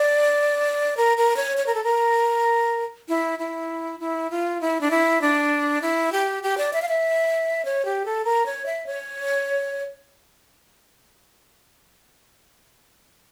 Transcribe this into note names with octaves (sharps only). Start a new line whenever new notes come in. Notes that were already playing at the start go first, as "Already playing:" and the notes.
Already playing: D5
A#4
A#4
C#5
C#5
A#4
A4
A#4
E4
E4
E4
F4
E4
D4
E4
D4
E4
G4
G4
D5
E5
F5
E5
C#5
G4
A4
A#4
C#5
E5
C#5